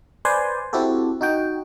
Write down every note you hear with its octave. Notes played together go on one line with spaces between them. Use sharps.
B4 C5 D5 G#5 C6
C4 E4 F#4 G4 A4
D#4 F#4 G5